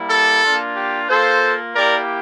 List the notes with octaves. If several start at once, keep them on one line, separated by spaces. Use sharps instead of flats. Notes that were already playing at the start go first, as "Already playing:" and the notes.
Already playing: G3 A#3 E4
A4
A#3 D4 F4
G4
A#3 F4 A4 C5
A#3 E4 G4 A#4 D5